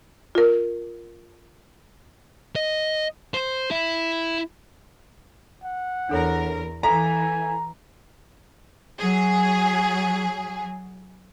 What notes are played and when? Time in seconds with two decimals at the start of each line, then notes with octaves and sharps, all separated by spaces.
0.35 F4 A#4
2.56 D#5
3.34 C5
3.71 E4
5.64 F#5
6.09 E2 D4 A4 A#4 C#5
6.83 E3 A4 F5 G#5 A#5 B6
9.00 F#3 G#4